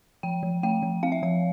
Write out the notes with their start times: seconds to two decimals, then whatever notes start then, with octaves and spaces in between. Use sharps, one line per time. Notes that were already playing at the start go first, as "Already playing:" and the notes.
0.23 F3 G5
0.43 F3
0.63 A3 G5
0.82 F3
1.03 C4 F5
1.12 E5
1.22 F3 F5